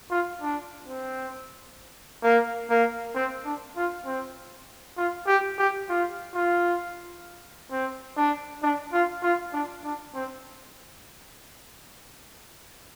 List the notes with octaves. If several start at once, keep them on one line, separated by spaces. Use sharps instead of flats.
F4
D4
C4
A#3
A#3
C4
D4
F4
C4
F4
G4
G4
F4
F4
C4
D4
D4
F4
F4
D4
D4
C4